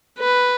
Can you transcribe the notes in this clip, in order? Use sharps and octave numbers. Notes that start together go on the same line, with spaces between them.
B4